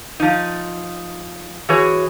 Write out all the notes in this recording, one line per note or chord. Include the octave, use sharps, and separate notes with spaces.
F3 D#4
E3 F#4 G#4 C#5